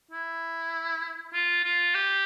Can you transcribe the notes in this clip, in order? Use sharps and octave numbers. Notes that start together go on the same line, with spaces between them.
E4
F4
F4
G4